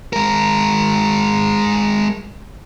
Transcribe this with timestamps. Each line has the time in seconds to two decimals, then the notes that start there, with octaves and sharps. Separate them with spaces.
0.13 G#3 A#4